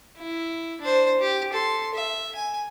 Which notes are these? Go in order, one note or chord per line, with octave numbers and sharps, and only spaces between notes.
E4
D4 C5
G4
A4 C6
E5
G#5